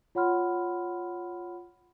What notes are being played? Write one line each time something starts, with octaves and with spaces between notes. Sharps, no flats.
F4 C#5 F#5 B5 C6 F6